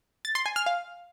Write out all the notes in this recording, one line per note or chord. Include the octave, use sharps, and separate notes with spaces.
A6
C6
G#5
F6
F5